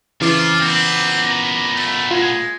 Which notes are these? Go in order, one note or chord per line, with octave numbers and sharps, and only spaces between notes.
F2 C#3 E3 F4 D6
A#2 B3 C4
A#5
A3
G#3 F4